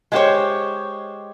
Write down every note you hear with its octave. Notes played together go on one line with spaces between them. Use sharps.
G#3 A3 B3 G4 C5 C#5